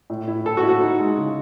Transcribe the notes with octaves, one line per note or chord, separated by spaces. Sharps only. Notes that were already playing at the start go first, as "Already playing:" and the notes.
A2
E4
A2 A4
F#4
E4
F#4
D#4
G#3
C#3